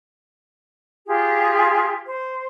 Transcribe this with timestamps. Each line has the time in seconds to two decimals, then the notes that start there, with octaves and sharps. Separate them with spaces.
1.07 F4 G4 G#4
2.06 C5